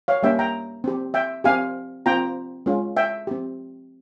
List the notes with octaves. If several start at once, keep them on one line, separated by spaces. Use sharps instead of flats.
C#5 F5
G3 A#3 C#4 G4 E5 G5
G5 A#5
C4 G4
E5 G5
C4 G4 F5 G#5
C4 F4 G5 A#5
G#3 C#4 F4
E5 G5
C4 G4